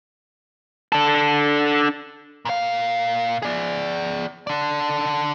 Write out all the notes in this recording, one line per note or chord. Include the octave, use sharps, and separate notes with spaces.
D4 A4
A#2 F5
G#4 D5
D3 D5